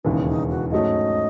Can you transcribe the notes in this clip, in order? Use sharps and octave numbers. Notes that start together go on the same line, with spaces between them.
E1 D#2 C#3 E3 D#4
D#4
F#4
G#2 F#3 A3 C#4 D#5